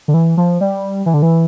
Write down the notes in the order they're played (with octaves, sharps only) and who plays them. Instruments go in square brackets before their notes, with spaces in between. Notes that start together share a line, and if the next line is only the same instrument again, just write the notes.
[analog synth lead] D3
E3
F3
G3
E3
D3
E3